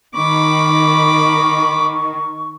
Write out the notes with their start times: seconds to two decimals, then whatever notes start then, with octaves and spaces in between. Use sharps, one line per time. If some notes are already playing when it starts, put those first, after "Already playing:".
0.15 D#3 B5 C#6 D6